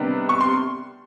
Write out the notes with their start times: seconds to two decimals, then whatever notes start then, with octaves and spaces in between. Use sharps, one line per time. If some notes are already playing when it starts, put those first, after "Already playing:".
Already playing: C3 D#3 G3 B3 D4
0.29 C#6
0.41 C6